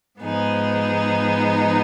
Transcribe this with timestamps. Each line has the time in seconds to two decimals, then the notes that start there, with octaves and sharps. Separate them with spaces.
0.20 G#2 F3 B3 D#4 G#4